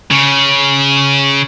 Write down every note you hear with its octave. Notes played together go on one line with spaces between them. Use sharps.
C#3